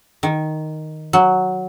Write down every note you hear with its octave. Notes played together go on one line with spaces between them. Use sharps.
D#3
F#3